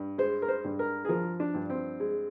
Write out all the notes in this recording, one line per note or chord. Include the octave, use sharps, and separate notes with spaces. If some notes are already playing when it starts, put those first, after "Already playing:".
Already playing: G2
G#3 C5
A#4
C5
G2
A#4
G#4
F3 A#4
D4
G2
C4
G#3